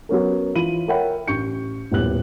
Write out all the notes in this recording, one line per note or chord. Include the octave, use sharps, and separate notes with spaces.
F#3 B3 C#4 A#4
E3 F4 B5 D#7 F#7
A#4 C#5 E5 F#5 G5 B5
A1 C#6 G6 C#7
D#1 A2 B3 G4 F#6 F#7